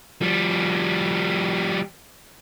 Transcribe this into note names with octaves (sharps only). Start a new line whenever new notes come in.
F3 G3